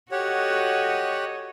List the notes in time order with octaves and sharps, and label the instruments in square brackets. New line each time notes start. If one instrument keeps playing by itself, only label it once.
[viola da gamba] F#4 A4 D#5 [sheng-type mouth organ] G4 C#5 F#5